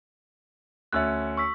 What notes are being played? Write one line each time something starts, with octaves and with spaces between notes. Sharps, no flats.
D2 C#4 E5 E6 F#6
C#6 E6 B6